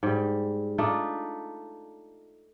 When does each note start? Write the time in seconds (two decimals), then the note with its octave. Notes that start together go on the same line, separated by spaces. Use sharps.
0.03 G#2 G3
0.78 A3 D4 D#4 F4